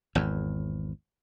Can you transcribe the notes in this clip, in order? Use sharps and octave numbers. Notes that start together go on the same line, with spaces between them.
G#1 E2